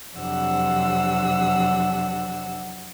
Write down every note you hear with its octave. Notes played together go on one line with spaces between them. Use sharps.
F2 C3 F#3 D4 F#5 E6